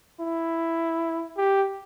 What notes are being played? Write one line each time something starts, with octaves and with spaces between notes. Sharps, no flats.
E4
G4